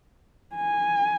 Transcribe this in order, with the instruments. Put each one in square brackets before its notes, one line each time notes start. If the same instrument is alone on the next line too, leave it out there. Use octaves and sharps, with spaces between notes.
[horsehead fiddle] G#5